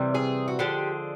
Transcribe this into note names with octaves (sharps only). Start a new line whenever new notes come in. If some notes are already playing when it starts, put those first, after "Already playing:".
Already playing: C3 E3 G3
G#4
F#4
D3 F3 G#3 G4